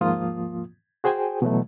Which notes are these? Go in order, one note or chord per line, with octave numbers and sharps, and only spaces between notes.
D#2 G#2 F3 A#3 F4 D#6
F#4 G#4 C5 G5 G#5
B2 E3 F#3 A3